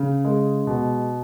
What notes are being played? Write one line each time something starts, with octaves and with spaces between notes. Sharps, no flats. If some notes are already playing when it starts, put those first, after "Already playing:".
Already playing: C#3
G#3
B2